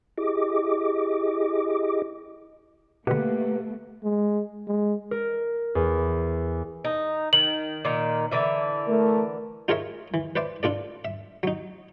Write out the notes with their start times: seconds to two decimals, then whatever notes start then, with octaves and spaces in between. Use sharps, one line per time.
0.18 E4 G4 G#4 D#5 D6
3.07 B2 D3 A3 A#3 G4 B4 F#5
4.04 G#3
4.68 G#3
5.11 A#4
5.75 E2
6.84 D#4
7.33 D#3 F#7
7.85 A#2 D#3
8.31 D3 E3 E5
8.87 A3 A#4
9.68 D#4 F4 G#4 A#4 C#5 E5
10.14 E3
10.36 B4 C5 D5 E5
10.63 D4 F4 A4 D5
11.05 E5
11.43 F#3 D#4